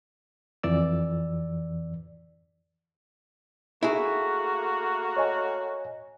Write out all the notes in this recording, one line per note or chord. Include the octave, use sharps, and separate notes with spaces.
F2 E3 D5 E6
A3 A#3 E4 F#4 G#4
C#5 D#5 G#5